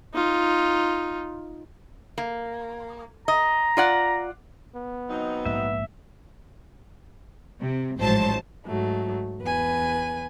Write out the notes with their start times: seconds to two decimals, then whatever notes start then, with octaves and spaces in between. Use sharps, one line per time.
0.14 D#4 F4
2.18 A#3
3.28 D#5 A#5
3.77 F4 D5 F#5
4.75 B3
5.09 F#3 C4 D#4
5.46 A#1 G#2 A#3 E5
7.61 C3
7.97 A1 G#2 F3 F#3 C5 A5
8.66 G#2 F#3 A3
9.41 E2 B4 G#5